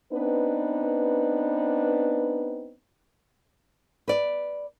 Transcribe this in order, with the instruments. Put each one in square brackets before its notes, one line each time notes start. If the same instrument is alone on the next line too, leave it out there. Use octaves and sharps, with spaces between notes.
[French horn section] B3 C4 D4 D#4 B4
[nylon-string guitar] B4 D5